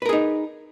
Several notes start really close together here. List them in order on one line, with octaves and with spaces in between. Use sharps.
B4 A#4 G#4 D#4